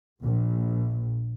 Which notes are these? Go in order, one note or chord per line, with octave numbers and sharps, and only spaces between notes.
A#1